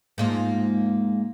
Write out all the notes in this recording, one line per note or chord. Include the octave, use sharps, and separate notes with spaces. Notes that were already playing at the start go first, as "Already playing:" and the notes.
G#2 A#3 F4